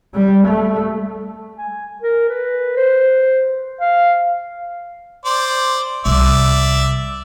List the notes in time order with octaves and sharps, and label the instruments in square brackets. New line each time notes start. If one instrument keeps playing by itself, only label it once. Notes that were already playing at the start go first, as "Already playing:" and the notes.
[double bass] G3
A3
[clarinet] G#5
A#4
B4
C5
F5
[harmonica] C5 D5
[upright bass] C2 [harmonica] D5 E5